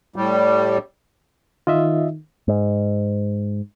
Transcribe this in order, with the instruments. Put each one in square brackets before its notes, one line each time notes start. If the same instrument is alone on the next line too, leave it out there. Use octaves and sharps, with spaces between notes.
[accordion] A2 G3
[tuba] D#3 [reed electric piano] F4 D#5 E5
[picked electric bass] G#2